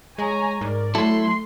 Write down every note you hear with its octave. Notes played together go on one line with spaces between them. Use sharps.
G#3 C#5 G#5 A#5
G#2 A#4 D5
F#3 A3 E4 A4 C6